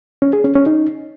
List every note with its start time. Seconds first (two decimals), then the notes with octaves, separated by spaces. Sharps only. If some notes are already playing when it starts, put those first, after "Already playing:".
0.22 C#4
0.33 G#4
0.44 C#4
0.55 C#4
0.66 D#4